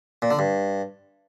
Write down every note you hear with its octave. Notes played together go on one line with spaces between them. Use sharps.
A#2
D3
G2